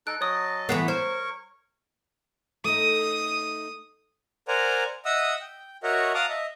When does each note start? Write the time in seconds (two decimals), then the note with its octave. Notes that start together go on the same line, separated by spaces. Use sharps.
0.07 D#4 A4 F#6 D7
0.21 F#3 C#5 D#5 A5 D#6
0.69 E3 A3 B3 C7
0.88 A#4 C5 C#5 C#6
2.64 A3 D#4 D#6
4.48 A#4 C5 D5 F#5 G#5 A#5
5.05 D#5 E5 F#5 D#6 E6
5.41 G5
5.83 F#4 A#4 C#5 D#5 E5 F#5
6.15 F5 F#5 A5 A#5 D6 D#6
6.29 D#5 E5